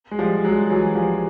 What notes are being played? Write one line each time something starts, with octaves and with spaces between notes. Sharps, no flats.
G#3
F3 G3
F#3 G#3
E3 F#3
F3 G3